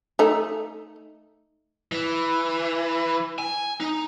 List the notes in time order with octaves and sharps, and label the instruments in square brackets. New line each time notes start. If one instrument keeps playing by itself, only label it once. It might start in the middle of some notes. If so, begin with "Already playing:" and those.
[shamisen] A3 D#4
[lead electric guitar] E3
G#5
D#4